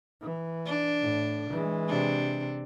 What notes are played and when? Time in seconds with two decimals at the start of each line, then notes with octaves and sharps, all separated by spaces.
0.21 E3
0.66 D4
1.01 A2
1.51 E3 G#3
1.88 C3 D4